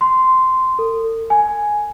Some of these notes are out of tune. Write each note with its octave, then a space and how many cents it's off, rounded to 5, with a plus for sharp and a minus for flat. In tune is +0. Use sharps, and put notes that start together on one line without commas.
C6 -10
A4 +45
G#5 +5